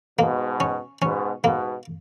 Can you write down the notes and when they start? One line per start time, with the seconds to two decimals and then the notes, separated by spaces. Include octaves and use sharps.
0.18 G#2 B2 A#3
0.60 C#4
1.02 G#2 B2 C#4
1.44 G#2 B2 A#3